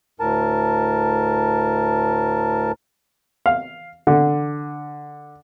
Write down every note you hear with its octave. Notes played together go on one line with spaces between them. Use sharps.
D2 A2 A#4 A5
F5
D3